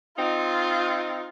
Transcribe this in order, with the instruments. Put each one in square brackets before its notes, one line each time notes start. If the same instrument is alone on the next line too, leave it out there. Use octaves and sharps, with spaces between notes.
[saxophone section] C4 D#4 [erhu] F4